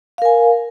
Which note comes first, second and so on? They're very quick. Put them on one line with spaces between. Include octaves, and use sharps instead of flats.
F5 A#4 G#5